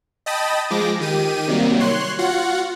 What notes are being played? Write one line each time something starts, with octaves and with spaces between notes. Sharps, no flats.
D#5 G5 A5 B5 D#6
F3 G#3 D6 A#6
D#3 G4 D#7
C3 D#3 F#3 G3 A#3
C#5 C6 F#6
F4 F#4 F#5